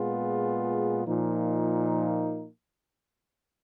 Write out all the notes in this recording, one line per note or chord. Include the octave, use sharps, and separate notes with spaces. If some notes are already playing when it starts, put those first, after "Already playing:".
Already playing: A#2 G#3 B3 F4 G#4
A#2 F3 A#3 D#4